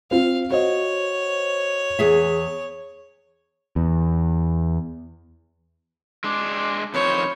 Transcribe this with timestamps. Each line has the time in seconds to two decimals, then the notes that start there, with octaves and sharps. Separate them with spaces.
0.11 C4 F4 F5
0.50 F#4 C5 C#5 D#5
1.99 E2 G#4 E5
3.76 E2
6.24 G#3 D4 C6 D6
6.94 F2 D#3 C5 C#5 B5